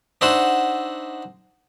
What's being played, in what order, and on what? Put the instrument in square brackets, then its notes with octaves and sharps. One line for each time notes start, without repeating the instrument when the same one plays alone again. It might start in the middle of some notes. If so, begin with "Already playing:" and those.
[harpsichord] D4 D#4 F#4 C5 E5 F#5